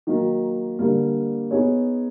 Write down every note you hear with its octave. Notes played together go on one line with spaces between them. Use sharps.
D#3 F#3 A#3
D3 G3 A#3
B3 D#4 G#4 C#5